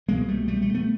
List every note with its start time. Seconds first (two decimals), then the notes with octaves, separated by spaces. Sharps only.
0.08 C2 B2 G#3 A#3
0.28 G3 A3
0.48 G3 A3
0.61 G3 A3
0.74 A3 B3